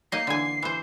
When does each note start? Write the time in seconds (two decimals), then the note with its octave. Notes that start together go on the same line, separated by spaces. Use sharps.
0.12 A#3 D#4 D#5 C7
0.27 D3 E3 G#5
0.62 E3 C5